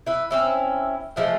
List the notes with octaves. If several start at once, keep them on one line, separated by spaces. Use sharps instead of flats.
E4 B4 E5
C4 C#4 E4
E3 F3 G#3 A3